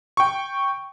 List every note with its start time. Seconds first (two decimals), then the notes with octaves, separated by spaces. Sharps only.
0.17 G5 C#6